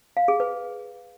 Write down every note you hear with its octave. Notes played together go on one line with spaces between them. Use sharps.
F5
G#4
B4